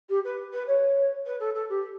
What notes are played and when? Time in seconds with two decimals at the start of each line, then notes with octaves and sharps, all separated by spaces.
0.09 G4
0.24 B4
0.53 B4
0.67 C#5
1.26 B4
1.40 A4
1.55 A4
1.69 G4